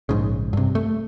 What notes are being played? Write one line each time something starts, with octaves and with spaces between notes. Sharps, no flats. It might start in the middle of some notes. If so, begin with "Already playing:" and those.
A#1 G#2 C#3
G2 C3
A3